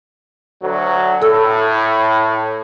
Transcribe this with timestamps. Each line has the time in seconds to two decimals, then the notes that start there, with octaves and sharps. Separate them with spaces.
0.63 D2 F#3
1.22 A2 A4 E6